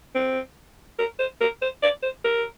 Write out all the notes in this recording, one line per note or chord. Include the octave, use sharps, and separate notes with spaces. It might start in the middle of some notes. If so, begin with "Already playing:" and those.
C4
A#4
C5
A#4
C5
D5
C5
A#4